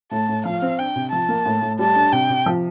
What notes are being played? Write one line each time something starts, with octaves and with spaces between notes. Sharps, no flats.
A2 A5
A2
F3 F5
C4
D4 G5
C3
F3 A5
A#3
A2
A2
G3 A5
D4
C3 G5
C3
F3